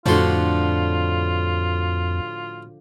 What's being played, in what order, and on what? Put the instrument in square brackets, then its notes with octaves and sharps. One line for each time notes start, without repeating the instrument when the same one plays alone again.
[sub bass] F2 [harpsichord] A2 F#4 C6 [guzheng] D3 F3 [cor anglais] F4